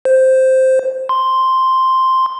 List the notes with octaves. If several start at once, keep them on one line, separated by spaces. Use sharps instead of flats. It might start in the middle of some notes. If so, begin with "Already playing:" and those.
C5
C6